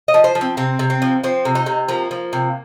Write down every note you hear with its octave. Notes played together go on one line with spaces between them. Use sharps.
D#5
F3
C5
F3
C4
C3 C4
C3
C4
F3
F3 C4
C3
D#4
C3
F3 A#3
F3
C3